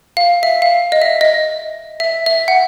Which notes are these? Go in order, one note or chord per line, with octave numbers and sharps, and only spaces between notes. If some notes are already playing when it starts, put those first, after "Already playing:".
F5
E5
F5
D#5
E5
D#5
E5
E5
F#5